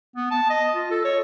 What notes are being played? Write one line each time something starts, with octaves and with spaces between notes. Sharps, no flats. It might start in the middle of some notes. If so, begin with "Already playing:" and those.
B3
A5
D#5
F4
A4
C#5